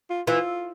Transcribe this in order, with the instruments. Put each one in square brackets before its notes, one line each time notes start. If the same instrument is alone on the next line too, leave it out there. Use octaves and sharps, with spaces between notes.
[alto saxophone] F4
[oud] E3 [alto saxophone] F4